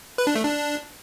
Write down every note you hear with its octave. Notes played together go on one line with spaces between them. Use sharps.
B4
D4
A3
D4